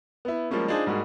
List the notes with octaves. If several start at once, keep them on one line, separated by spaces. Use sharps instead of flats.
B3 E4
F3 G3 G#3 A#3 C#4
D4 D#4 F4 G#4 C5
G#2 G3 G#3 A#3 F#4 G#4